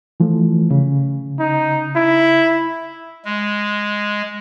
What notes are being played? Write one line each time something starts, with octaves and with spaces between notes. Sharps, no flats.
E3 F3 A3
C#3
D#4
E4
G#3